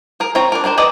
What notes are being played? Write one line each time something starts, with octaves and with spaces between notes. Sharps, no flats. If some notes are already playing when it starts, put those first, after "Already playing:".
G#4 A#4
C4 F4 C#5 A#5
D4 A#4
D4 G#4 A#4 C5
G#4 B4 D5 D#5